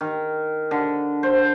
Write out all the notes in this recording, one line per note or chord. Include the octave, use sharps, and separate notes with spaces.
D#3
D3
C5